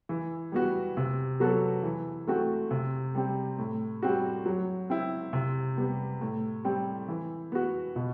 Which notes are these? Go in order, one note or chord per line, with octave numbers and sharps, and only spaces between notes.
E3
G3 B3 F#4
C3
F#3 B3 F#4 A4
E3
A3 C4 F#4
C3
G3 C4
A2
G3 C4 F#4
F#3
C4 E4
C3
G3 B3
A2
G3 C4
E3
B3 F#4
B2